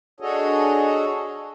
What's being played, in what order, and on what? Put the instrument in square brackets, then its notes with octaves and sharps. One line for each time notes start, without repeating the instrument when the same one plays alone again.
[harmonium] D4 F#4 G#4 A4 C#5 D#5